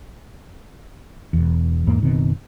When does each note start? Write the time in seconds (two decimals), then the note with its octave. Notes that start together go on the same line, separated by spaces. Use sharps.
1.33 E1 E2
1.87 E2 G#2 A#3
2.02 F#1 B2 D#3 C4